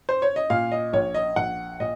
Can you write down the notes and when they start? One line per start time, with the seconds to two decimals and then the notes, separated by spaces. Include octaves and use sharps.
0.09 C5
0.22 C#5
0.36 D#5
0.50 A#2 F5
0.72 D#5
0.93 A#1 C#5
1.15 D#5
1.36 A#1 F#5
1.80 A#2 D#5